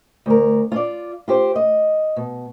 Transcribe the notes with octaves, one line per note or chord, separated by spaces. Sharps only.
D2 A#4
F4 D5
F4 G4 C5
D#5
B2